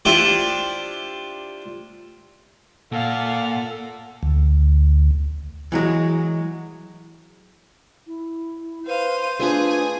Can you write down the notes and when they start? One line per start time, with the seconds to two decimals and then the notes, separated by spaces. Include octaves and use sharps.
0.05 D4 E4 F4 G4 C5
2.92 A#2 A4 F5 F#5
4.23 D2
5.72 E3 F#3 G#3
8.07 E4
8.87 B4 C5 F5 D#7
9.40 A3 D4 F4 G#4 B4 G#5